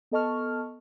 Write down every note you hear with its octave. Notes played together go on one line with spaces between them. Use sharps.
B3 A4 D#5 A5 C#6 F6